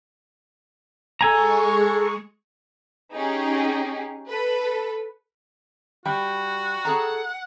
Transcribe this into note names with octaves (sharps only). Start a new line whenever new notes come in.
G#3 G#4 A4 G#5 A#5 C#6
C#4 D#4 G4 G#4
A4 B4
G3 F#4 G5 B5
G#4 A4 F#5 A#5